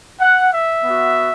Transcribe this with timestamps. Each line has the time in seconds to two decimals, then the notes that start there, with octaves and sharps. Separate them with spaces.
0.20 F#5
0.52 E5
0.85 B3 F#4